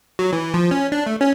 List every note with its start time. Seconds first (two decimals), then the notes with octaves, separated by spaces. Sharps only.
0.19 F#3
0.33 E3
0.54 F3
0.71 C#4
0.92 D4
1.06 A3
1.21 C#4